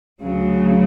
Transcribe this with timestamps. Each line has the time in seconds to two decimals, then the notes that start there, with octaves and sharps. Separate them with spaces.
0.21 D2 C#3 F#3